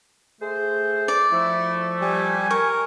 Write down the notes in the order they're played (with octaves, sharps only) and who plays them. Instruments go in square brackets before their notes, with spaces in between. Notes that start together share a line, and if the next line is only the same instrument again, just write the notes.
[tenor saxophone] A3 [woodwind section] G#4 C5
[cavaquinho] D5
[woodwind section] F3 A3 [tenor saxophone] E4
[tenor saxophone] G3 [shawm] G#5
[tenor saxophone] A#4 [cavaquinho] C#6